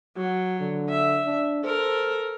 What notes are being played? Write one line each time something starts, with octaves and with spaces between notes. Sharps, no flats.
F#3 F#4
D3
E5
D4
A4 A#4 C5